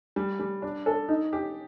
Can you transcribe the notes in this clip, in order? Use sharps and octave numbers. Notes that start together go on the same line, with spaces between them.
G3
G3
D4
A4
D#4
G4